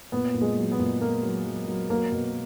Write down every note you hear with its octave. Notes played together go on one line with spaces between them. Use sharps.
A#2 B3
A#2
G#3
F#3
B3
A#2
A#2 A#3
F#3
F#3
F#3
F#3 A#3
B2